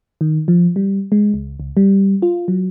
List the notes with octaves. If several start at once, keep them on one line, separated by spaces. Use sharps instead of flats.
D#3
F3
G3
G#3
C#2
C#2
G3
F4
F#3